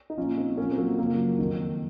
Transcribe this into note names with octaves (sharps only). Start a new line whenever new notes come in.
D#4
A#2 F3 C#4 F4
C4 D#4
A#2 F3 A#3 C#4
C4
F#3 A#3
F#2 C#3 F3 F#3 A#3
F2 D#3